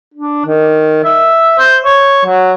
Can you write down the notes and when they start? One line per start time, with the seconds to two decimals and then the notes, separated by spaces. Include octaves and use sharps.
0.15 D4
0.46 D#3
1.04 E5
1.59 C5
1.84 C#5
2.26 F#3